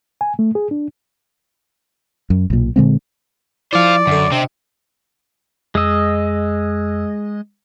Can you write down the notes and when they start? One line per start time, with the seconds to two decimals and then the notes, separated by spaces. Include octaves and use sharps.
0.21 G#5
0.39 A3
0.55 G#4
0.71 D4
2.30 F#2
2.50 B1 A#2
2.76 A#2 D3 G#3 C4
3.73 F3 E4 C5 D5 F5
4.07 F#2 D3 A4
4.32 C3 C4 D4 D5 D#5
5.75 F2 G#3 D#5 E6